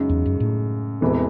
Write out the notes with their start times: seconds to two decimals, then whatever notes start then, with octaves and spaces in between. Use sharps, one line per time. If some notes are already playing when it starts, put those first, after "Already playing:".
Already playing: F#2 C#3 G#3 D#4
0.09 E2
0.26 F#2
0.40 A2
1.01 E1 E2 C3 E3 A3